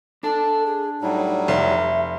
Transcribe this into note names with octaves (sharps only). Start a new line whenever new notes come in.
D4 A4 A5
G#4
A2 F#3 G3 D#4
F1 E5